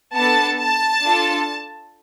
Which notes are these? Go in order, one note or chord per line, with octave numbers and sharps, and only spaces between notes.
B3 D4 A4 A5
A5
D4 F4 A4